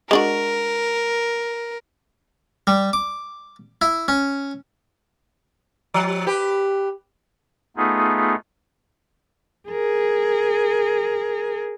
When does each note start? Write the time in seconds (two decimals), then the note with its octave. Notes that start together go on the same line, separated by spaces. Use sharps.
0.11 G#3 D4 F#4 A#4
2.67 G3
2.93 D6
3.82 E4
4.08 C#4
5.94 F3
6.27 G4 B4
7.77 A3 B3 D#4 F4 G#4
9.69 G#4 A#4